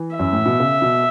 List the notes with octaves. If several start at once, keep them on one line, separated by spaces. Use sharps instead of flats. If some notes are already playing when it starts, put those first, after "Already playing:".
Already playing: E3
F#2 E5
A2
B2
C#3
B2